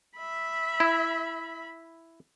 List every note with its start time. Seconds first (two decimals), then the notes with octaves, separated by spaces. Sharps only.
0.17 E5 B5
0.80 E4